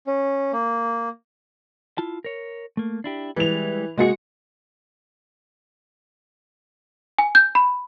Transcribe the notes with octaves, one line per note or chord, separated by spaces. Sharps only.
C#4
A#3
E4 F4 A5
A#4 C#5
A3 A#3
D4 E4 G4
E3 G3 G#3 F7
C3 G#3 A#3 F#4 G#4 C#7
G#5
G6
B5